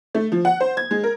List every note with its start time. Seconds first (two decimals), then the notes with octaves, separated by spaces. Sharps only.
0.15 A3
0.32 F3
0.45 F#5
0.60 C5
0.77 G#6
0.91 G#3
1.03 A#4